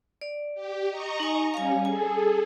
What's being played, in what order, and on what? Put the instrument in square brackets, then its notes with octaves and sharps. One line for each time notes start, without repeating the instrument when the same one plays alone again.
[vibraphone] D5
[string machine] G4
D#5 A#5 C#6
[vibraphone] D#4 G#5
[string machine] G3 C#4 [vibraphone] F5 G#5
[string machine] G#4 A4 [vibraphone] G#5